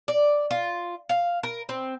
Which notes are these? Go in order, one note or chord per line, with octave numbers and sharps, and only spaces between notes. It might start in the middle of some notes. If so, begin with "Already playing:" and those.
D5
F4
F5
A#4
C4